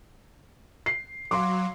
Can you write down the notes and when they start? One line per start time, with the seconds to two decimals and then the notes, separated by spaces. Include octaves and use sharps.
0.86 C7
1.31 F#3 F5 C6 D6